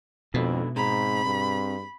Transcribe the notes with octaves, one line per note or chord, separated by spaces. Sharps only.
F2 G#2 B2 D3 E4
G#2 C4 G#4 A#5 B5
G2